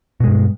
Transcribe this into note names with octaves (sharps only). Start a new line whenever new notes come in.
G2 B2 G#3